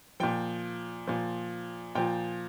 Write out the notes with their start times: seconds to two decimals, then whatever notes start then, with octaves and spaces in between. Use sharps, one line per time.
0.20 A#2 F3 G5
1.07 A#2 F3
1.95 A#2 F3 G5